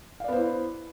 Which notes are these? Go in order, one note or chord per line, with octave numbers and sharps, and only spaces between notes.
B3 E4 C5 D5 F5